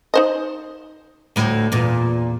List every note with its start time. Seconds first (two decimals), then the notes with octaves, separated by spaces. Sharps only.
0.14 D#4 C5 D#5
1.36 D2 A2
1.72 E2 A#2